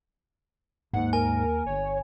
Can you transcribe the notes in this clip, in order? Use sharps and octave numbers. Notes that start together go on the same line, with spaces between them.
D#2 G#2 F#5
A#4 G#5
G1 C#5